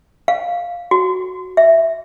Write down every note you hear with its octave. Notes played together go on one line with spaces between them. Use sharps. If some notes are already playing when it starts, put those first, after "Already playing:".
F5
F#4
E5